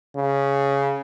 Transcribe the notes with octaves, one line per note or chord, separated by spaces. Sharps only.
C#3